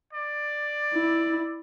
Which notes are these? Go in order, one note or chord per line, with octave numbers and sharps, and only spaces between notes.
D5
E4